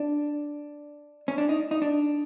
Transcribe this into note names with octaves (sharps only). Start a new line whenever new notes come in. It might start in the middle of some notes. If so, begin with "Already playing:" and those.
Already playing: D4
C#4
D4
D#4
D#4
D4